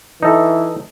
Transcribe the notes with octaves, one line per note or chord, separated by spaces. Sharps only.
E3 D#4 A4